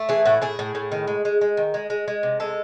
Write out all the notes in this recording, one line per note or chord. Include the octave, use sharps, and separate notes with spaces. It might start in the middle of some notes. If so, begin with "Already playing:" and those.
Already playing: A3
E3 G#4
A2 F#4
A2 G#4
A2
A2
D#3
G#3
G#3
G#3
D#3
G#3
G#3
G#3
C3
G#3 A4